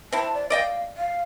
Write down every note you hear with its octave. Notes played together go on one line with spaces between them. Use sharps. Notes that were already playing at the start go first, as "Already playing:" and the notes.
C4 E4 A5
D5
D5 D#5 F5 G5
F5